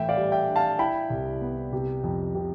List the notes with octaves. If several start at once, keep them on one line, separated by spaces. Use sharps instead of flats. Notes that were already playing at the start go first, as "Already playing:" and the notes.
Already playing: A2 E3 E5 G5
D5 F5
G3
E5 G5
D4
F5 A5
E4 G5 B5
C2
B3
C3
F2
C3